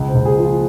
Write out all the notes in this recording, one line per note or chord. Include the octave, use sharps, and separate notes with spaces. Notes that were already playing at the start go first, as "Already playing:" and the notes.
Already playing: C#2
C5
C#2
G#4
F3
F4